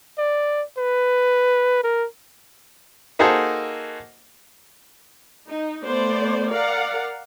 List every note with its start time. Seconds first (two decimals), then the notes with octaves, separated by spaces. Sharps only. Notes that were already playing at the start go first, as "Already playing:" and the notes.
0.18 D5
0.78 B4
1.84 A#4
3.19 A#3 D#4 F#4 G#4 A4 C5
5.48 D#4
5.86 A3 B3 C5 D5
6.49 A#4 D5 F5 F#5